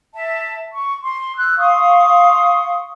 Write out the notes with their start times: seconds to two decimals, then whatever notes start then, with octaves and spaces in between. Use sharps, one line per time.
0.14 E5 A5
0.73 C#6
1.02 C6
1.36 E6 F#6
1.58 F5 C6 C#6 D#6